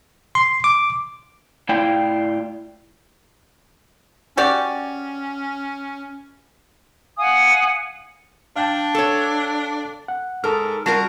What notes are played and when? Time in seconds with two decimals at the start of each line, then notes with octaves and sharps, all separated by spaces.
0.35 C6
0.64 D6
1.69 A2 E4 F4 D5 G5
4.37 C#4 F#4 G4 D5
7.18 F5 F#5 G#5 D#6
8.56 D4 F5 G5 A5
8.95 A4 C#5
10.08 F#5
10.44 G#2 A4 A#4 F6
10.86 G3 F4 F#4 A#4 A5